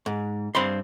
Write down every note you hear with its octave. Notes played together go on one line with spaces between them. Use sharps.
G#2
G2 C4 B5 C6